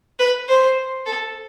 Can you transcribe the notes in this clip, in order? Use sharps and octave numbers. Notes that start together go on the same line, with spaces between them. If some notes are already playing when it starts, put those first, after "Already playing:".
B4
C5
A4